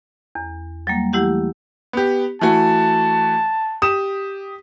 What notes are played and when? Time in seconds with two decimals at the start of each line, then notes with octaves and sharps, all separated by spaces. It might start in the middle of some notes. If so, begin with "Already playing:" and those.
0.35 E2
0.87 F#3 G3 A#3
1.13 E3 A3 E4 G4 F#5
1.93 B3 G4
2.41 E3 A3 F#4 A5
3.82 G4 D#6 E7